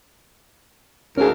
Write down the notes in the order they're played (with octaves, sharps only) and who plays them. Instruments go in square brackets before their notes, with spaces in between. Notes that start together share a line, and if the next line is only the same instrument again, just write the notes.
[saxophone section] D2 G#2 A#4 [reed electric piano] C#4 G#4